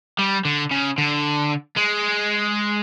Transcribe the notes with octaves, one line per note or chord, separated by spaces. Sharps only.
G3
D3
C#3
D3
G#3